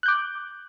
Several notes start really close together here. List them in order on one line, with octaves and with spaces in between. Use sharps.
F#6 G6 D6